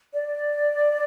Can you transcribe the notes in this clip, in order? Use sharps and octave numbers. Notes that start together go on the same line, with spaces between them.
D5